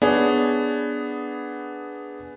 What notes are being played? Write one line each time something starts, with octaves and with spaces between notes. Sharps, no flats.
B3 D4 G#4 C#5